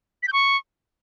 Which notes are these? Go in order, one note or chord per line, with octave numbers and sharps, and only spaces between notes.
B6
G6
C#6